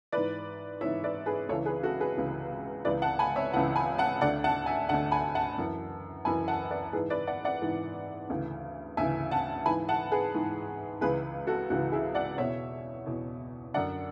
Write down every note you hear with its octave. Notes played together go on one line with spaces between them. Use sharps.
G#2 E3 B4 D5
G#2 E3 C#5 E5
B4 D5
G#4 B4
C#2 C#3 E3 A4 C#5
G#4 B4
F#4 A4
G#4 B4
C#2 C#3 E3
C#2 C#3 E3 B4 D5
F#5 A5
G#5 B5
C#5 E5
C#2 C#3 E3 F#5 A5
G#5 B5
F#5 A5
D2 D3 D5 F#5
F#5 A5
E5 G#5
D2 D3 F#5 A5
G#5 B5
F#5 A5
F#2 E3
F#2 E3 G#5 B5
F#5 A5
B4 D5
G#2 E3 G#4 B4
B4 D5
D5 F#5
D5 F#5
G#2 E3
D2 C#3 E3
D2 C#3 E3 E5 G#5
F#5 A5
G#2 E3 G#5 B5
F#5 A5
G#4 B4
G#2 E3
C#2 C#3 E3 G#4 B4
F#4 A4
C#2 C#3 E3 F#4
E4 G#4
D5 F#5
E2 B2 C#5 E5
E2 B2
F#2 D3 D5 F#5